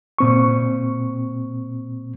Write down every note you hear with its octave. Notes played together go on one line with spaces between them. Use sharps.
A#2 C4 C#6